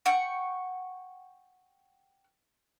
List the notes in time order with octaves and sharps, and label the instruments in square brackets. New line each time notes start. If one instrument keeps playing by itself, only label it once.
[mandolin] F#5 G5 C#6